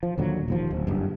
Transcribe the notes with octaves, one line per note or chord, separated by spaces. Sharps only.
F3
D#2 A#2 D3 F#3
E1 D#2 F3
D1
F#1 G2